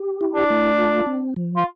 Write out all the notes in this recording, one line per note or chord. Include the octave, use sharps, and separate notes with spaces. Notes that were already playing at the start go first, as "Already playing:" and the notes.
Already playing: G4
E4
D4
A3
F4
C4
F3
F4